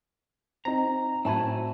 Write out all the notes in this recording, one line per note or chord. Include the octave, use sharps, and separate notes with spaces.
C4 D#4 A#5
A2 C4 F4 F#4 G#5 A5 B5